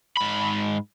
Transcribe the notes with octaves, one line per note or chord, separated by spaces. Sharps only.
G#2 B5